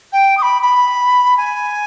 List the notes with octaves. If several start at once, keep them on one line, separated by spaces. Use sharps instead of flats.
G5
D#6
B5
B5
G#5